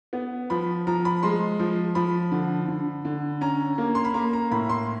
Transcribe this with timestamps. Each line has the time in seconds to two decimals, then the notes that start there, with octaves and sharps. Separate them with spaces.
0.13 B3
0.50 F3 B5
0.87 F3 A#5
1.05 B5
1.23 G#3 C6
1.59 F3
1.95 F3 B5
2.32 D3
2.68 D3
3.05 D3
3.41 C#4 A#5
3.78 A#3
3.95 C6
4.05 B5
4.14 A#3 A#5
4.33 A#5
4.51 A2 B5
4.69 C6